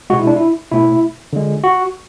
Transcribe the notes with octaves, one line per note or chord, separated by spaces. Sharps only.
B2 G#3 F#4
E4
D4
E4
B2 A3 E4
D3 G#3
F#4